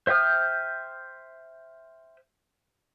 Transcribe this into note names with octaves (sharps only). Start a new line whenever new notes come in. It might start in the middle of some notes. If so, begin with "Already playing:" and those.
C5 E5 G5 D#6 F6